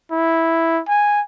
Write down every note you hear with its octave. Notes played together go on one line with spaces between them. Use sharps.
E4
G#5